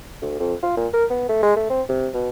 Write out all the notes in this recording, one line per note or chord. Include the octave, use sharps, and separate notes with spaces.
D2
F2
F4
A#2
A#4
B3
A3
G#3
A3
C4
C3
B2